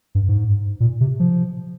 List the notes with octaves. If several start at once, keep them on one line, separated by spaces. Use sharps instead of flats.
G2
G#2
A#2
C3
F3